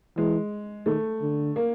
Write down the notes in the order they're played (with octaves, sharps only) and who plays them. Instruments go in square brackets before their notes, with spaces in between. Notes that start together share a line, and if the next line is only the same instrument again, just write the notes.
[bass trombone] E3 [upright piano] G#3
[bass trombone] D#3 [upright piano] A3
[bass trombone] D3
[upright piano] A#3